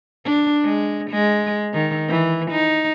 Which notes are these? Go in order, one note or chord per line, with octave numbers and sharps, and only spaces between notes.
D4
G#3
G#3
D#3
E3
D#4